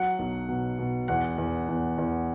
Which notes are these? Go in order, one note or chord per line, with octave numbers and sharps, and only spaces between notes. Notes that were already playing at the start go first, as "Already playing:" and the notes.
Already playing: F#3 F#5
B1
B2
B2
E2 F#5
E2
E2
E2